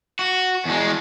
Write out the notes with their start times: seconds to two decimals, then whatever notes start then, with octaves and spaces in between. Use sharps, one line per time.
0.19 F#4
0.65 E2 G#3